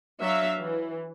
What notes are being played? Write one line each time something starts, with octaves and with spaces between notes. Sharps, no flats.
F#3 D4 E5 F5
E3